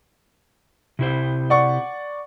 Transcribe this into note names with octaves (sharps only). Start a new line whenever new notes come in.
C3 E4 C5
D5 F#5 C#6